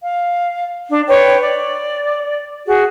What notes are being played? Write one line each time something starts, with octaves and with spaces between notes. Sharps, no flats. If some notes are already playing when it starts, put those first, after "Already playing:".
F5
D4
B4 C#5 G5
D5
F#4 G#4